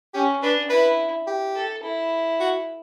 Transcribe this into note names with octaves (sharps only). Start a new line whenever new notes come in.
C#4 G4
D4 B4
E4 B4
G4
A4
E4
F#4